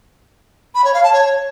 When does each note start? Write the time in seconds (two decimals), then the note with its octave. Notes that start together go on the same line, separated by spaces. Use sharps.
0.75 B5
0.84 C#5
0.94 F5
1.03 A5
1.13 C#5